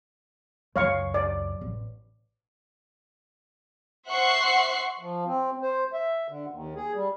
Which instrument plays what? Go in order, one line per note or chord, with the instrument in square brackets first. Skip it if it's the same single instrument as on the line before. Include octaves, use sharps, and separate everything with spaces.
[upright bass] C#2 F#2 [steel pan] C#5 F5 C#6
[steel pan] D5
[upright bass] A1
[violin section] C5 E5 F#5 C#6 F#6 C7
[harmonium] F3
C4
C5
E5
D3
D#2
G#4
G3